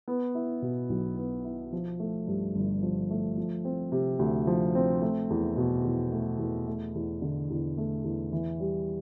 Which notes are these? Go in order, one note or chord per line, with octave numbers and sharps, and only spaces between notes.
B3
E4
B2
B1
B3
E4
F3
A3
G2
G1
F3
A3
F3
C4
C3
D2
F3
C4
A3
E2
B2
E2
A3
E2
A3
E2
D3
E2
A3
E2
E3
G3